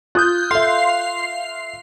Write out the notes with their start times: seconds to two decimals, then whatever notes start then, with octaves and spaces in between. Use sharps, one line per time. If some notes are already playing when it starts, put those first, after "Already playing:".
0.15 F4 D#6 F#6 G6
0.51 A4 E5 F5 C6 C7